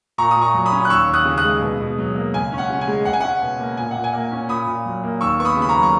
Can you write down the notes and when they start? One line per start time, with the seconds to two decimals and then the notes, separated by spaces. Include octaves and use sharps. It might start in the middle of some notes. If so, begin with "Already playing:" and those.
0.18 A#2 A#5 C#6
0.31 D#6
0.36 A#2
0.42 A#5 C#6
0.54 F#3
0.66 B5 D#6
0.72 C#4
0.85 F#6
0.90 D#2 C#6 E6
1.08 D#2
1.14 D#6 F#6
1.25 C#3
1.38 D#6 F#6
1.44 G#3
1.62 B2
1.80 B2
1.98 F#3
2.15 A#3
2.33 C#2 G#5
2.52 C#4
2.58 F#5
2.70 C#3
2.81 G#5
2.88 G#3
3.05 C#2 F#5
3.13 G#5
3.20 C#4 F#5
3.42 B2
3.59 A#3
3.77 A#2 G#5
3.91 A#2 F#5
4.04 G#5
4.13 A#3
4.31 C#4
4.49 A#2 B5 D#6
4.67 A#2
4.86 F#3
5.03 A#3
5.21 D#2 C#6 E6
5.39 B3 C#6
5.45 B5 D#6
5.57 C#3
5.62 B5
5.69 A#5 C#6
5.74 F#3
5.83 C#6